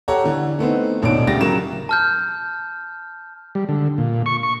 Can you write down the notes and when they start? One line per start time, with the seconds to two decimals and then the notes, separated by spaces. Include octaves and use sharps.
0.08 G4 A4 C#5 F#5 A#5
0.24 D3 E3
0.59 A3 B3 C4 D#4
1.02 D#1 A1 B2 D4 D#4 D7
1.27 D2 C#3 G4 A6 A#6
1.41 C#3 F#3 A#4 E7
1.89 A5 F6 G6
3.55 G3
3.69 D3
3.98 A#2
4.26 C#6
4.43 C#6